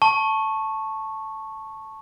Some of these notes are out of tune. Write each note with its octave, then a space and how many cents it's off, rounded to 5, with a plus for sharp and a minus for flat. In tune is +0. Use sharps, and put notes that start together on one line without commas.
A5 +0 C#6 -10